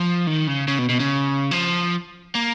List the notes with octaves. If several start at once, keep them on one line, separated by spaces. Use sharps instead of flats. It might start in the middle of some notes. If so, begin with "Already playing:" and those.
Already playing: F3
D#3
C#3
C#3
B2
B2
C#3
F3
A#3